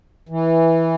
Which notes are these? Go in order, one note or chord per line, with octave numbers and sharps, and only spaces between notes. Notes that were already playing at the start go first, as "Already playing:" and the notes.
E3